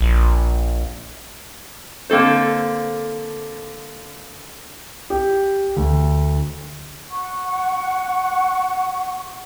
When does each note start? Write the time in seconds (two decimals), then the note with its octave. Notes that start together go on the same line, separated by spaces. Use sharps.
0.01 A#1
2.10 D3 A#3 C4 A4 C5
5.10 G4
5.76 D2
7.11 F#5 C#6